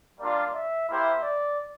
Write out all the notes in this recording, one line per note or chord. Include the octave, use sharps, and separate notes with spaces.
G3 A#3 D4 F4 D5
E5
A#3 E4 G4 C5 E5
D5